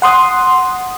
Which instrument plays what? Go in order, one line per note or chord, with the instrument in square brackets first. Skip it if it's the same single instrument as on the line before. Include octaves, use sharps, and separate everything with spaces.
[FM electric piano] F#5 C6 D#6